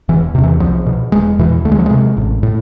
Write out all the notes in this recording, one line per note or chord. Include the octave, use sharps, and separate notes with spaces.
E1 E3
E2 C3
E3
C2 F3
B2
E1 G#3
E2 B2 E3
D2 A3
G#3
F3
C3 G#3
A1
A2